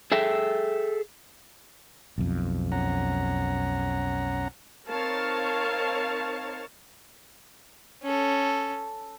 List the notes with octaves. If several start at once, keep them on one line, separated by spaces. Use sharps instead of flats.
G#4 A4 E5 G5
B1 F2
C#4 F#5 A#5
C4 D#4 A#4 C#5 F5 A5
C#4 A4